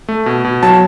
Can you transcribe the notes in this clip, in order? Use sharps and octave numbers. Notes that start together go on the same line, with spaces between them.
A3
B2
B2
F#3 A5